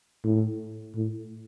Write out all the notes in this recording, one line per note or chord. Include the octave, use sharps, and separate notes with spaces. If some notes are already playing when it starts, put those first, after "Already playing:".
A2
A2